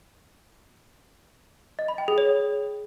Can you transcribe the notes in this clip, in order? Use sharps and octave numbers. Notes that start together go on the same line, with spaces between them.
D#5
B5
G5
G#4
C#5